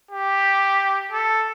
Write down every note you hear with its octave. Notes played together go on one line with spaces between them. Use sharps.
G4
A4